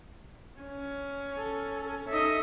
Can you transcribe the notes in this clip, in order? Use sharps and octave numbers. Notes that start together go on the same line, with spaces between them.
C#4
A4
D#4 A4 D#5 E5